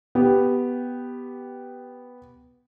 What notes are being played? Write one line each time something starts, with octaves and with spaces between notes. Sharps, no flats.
B3 G4